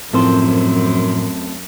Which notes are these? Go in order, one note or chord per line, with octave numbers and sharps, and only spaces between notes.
F#2 A2 F3 A3 C4 A#4 C5